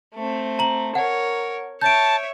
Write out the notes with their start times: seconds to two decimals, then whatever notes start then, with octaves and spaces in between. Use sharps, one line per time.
0.15 A3 C4
0.59 A#5 F#7
0.95 A#4 C#5 F#5
1.81 C#5 E5 A5 G6 D7